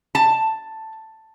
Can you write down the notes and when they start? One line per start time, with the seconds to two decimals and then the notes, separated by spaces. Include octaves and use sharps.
0.15 A5